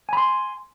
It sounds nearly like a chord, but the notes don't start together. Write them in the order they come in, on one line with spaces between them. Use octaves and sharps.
G#5 B5 C6